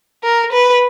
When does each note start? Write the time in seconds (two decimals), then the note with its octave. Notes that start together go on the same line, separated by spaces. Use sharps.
0.24 A#4
0.53 B4